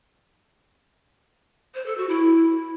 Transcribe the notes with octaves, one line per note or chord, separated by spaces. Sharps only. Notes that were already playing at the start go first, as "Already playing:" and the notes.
C5
A4
F#4
E4